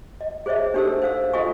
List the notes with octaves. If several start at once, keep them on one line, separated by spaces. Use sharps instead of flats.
D#5
G#4 C5 C#5 D#5 E5
D4 D#4 G4 A4 C5 E6
C5 F5 E6
F4 A4 D#5 F5 G#5 C#6